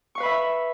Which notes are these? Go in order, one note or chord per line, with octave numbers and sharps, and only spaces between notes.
B4 E5 F5 B5 C#6